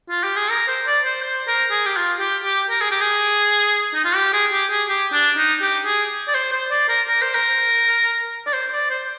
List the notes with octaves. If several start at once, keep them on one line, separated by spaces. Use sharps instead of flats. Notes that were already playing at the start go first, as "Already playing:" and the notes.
F4
G4
G#4
A#4
C5
D5
C5
C5
A#4
G#4
G4
F4
G4
G4
A#4
G#4
G4
G#4
D#4
F4
G4
G#4
G4
G#4
G4
D4
D#4
G4
G#4
D5
C5
C5
D5
A#4
A#4
C5
A#4
D5
C5
D5
C5